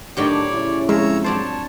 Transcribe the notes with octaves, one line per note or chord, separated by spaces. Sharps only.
A2 D#3 F#3 D4 G4 C#5 D5
C#3 C#4 E4
F2 G#3 C#5 A#5 E6
F#3 D4 C5 C#5 A5